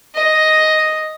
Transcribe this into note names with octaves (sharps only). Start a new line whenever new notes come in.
D#5